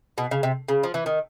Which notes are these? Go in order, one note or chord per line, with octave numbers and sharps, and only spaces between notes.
B2
C#3
C3
C#3
F3
E3
D#3